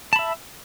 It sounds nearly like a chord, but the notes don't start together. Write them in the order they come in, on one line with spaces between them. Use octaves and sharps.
A5 B5 E5